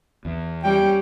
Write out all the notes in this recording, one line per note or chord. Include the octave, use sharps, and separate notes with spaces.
E2
G3 C#4 G5